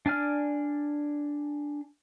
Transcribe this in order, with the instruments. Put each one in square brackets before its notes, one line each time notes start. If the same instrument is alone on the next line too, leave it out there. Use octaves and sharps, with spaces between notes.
[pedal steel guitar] D4 D5 G#5 F6